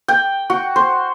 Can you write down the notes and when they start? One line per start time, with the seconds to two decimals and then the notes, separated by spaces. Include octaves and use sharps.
0.08 G5
0.50 F#4
0.76 C5